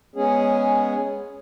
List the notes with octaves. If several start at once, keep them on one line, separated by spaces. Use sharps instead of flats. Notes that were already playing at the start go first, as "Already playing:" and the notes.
G#3 B3 C#4 G#4